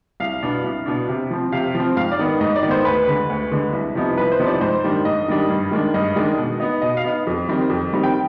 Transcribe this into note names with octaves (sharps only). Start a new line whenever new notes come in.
C2 F5
B2 B3 D4
C2
B2 B3 D4
C3
F3 C4
C3 F5
F3
C4
G#2 F5
D5
D#3 B3
G#2 D#5
D5
D#3
B3 C5
D2 B4
D3 G#3
D2
D3 G#3
C2
C3 F3 B3 D#4
C2 B4
C5
C3 F3 B3 D#4
D5
G#2 C5
D#3 G3 D4
G#2 D#5
D#3 G3 D4
G2
D#3 G#3 D4
G2 D#5
D#3 G#3 D4
B2
B3 D#4
B2 D#5
F5
B3 D#4
F2
D#3 G3 C4 D#4
F2
D#3 G3 C4 D#4
G5